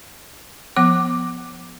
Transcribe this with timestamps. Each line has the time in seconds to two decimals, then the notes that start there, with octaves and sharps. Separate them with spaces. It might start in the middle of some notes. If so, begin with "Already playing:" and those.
0.76 F3 B3 D6